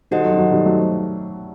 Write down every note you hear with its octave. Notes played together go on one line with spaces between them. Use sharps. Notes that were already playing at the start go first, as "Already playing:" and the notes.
D#3 G3 F#4 A4 C5 D#5 F#5
F#3
D#3
F#3
D#3 G3
F#3 A3